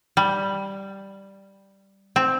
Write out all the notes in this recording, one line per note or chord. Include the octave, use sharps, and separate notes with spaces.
G3
C4